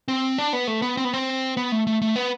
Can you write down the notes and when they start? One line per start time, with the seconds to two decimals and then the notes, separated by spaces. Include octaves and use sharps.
0.08 C4
0.38 D4
0.53 B3
0.67 A3
0.82 B3
0.97 C4
1.05 B3
1.13 C4
1.57 B3
1.72 A3
1.87 A3
2.02 A3
2.16 B3